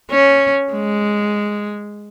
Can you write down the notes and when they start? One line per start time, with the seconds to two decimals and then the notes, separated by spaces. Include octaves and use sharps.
0.11 C#4
0.73 G#3